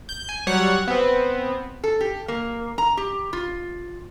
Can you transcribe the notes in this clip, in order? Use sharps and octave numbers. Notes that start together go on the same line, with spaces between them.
G6
G#5
F#3 G3 C#5 F#5
B3 C4
A4
G4
A#3
A#5
G4
F4